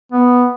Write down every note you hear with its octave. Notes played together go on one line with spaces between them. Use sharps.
B3